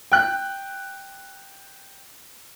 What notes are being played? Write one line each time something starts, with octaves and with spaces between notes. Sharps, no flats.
G5 F#6